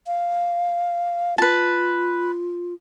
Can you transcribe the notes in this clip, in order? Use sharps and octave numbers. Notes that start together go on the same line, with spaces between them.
F5
F4 B4 A5